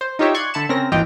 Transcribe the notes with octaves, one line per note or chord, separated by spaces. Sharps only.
C5
D#4 F4 G4 C#5 E5
D5 C6 C#6 F#6 G#6
D3 E5 A5 B5 C#7 E7
C#3 C4 C#4 A#4 A#6
G#1 D#2 E3 F4 D#5 G5